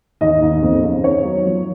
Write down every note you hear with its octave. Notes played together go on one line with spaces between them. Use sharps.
D#2 D#5
D#2
F2
C#3
D#3 C#5
F#3
F3